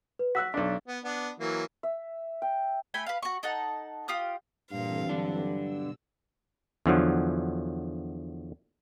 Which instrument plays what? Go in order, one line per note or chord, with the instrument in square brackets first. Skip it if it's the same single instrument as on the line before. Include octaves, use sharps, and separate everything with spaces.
[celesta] B4
[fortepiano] F#4 E6 F#6 [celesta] B6
[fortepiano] B1 D4
[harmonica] B3
B3 D4
E3 F#3 A#3
[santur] E5
G5
[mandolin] A3 G5 G#5 B5
B4 F5
F#4 C#6
D#4 A4 F#5
F4 G4 D#6 F6
[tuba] G2 [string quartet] A#2 F5 [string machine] E3 C4 A4
[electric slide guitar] D3 D4 [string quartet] F#3
[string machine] B2 E6
[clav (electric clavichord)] E2 D3 F3 F#3